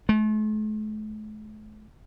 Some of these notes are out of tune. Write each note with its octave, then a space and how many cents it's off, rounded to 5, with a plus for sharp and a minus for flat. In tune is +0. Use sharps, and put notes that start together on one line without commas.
A3 -45